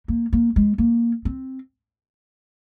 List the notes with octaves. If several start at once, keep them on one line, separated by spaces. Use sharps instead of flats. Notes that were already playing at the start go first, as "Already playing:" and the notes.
A#3
A#3
G#3
A#3
C4